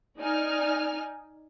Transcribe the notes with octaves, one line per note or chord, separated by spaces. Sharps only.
D#4 D5 G#5 F6